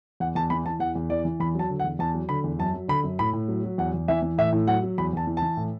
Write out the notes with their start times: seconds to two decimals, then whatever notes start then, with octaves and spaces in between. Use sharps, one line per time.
0.20 E2 F#5
0.35 E2 A5
0.50 E3 B5
0.66 E3 A5
0.80 E2 F#5
0.95 E2
1.10 E3 D5
1.25 E3
1.40 E2 B5
1.55 F#3 A5
1.70 D3
1.80 F#5
1.84 E2
1.99 E2 A5
2.14 F#3
2.29 D3 B5
2.44 E2
2.59 F#2 A5
2.74 F#3
2.88 D3 B5
3.04 F#2
3.19 A2 B5
3.33 A2
3.48 F#3
3.64 F#3
3.78 E2 F#5
3.94 E2
4.08 E3 E5
4.23 E3
4.38 A2 E5
4.52 A2
4.67 F#3 F#5
4.83 F#3
4.98 E2 B5
5.13 E2 A5
5.27 E3
5.37 A5
5.42 E3
5.57 A2